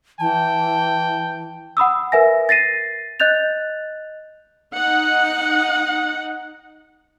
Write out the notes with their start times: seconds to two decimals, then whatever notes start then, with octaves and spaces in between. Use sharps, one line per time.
0.20 E3 G5 A5
1.77 F#5 B5 D#6 E6
2.12 A#4 B4 E5 G#5 A#6
2.49 A6 A#6 C7 D#7
3.20 D#5 F#6 G6 A6 F7
4.73 D#4 F#5